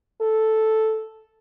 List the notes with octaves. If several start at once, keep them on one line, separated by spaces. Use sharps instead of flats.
A4